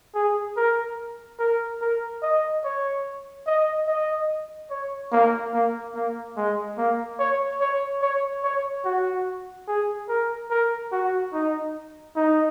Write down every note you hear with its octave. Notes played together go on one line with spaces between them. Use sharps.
G#4
A#4
A#4
A#4
D#5
C#5
D#5
D#5
C#5
A#3
A#3
A#3
G#3
A#3
C#5
C#5
C#5
C#5
F#4
G#4
A#4
A#4
F#4
D#4
D#4